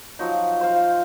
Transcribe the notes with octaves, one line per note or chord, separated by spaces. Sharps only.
F3 F#3 D#4
C5 F5